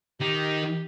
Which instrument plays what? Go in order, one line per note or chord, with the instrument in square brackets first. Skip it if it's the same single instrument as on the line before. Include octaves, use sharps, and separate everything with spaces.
[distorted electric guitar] D#3 D#4 [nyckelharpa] G4